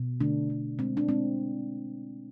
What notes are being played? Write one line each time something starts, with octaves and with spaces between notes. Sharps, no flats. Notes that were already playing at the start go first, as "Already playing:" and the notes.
Already playing: B2
D3 A3 D4
D3
G#3 C4
D4
G#3 C4